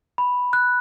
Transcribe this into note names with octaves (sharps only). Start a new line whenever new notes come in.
B5
F#6